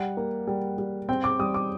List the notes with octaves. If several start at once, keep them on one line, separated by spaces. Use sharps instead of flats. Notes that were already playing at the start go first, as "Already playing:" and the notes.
Already playing: G3 F#5
A#3
G3
G3
C4 G5
D6
G3 D#6
D6